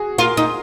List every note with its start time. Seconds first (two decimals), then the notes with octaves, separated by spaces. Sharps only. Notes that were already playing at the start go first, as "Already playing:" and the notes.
Already playing: F#4 G#4
0.18 F4 A#4
0.37 D#4